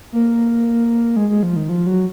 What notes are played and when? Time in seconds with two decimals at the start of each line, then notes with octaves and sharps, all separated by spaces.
0.12 A#3
1.16 G#3
1.30 G#3
1.43 F3
1.56 D#3
1.69 F3
1.86 F#3